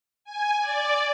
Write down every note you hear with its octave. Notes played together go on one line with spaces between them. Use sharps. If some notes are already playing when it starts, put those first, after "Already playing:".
G#5
D5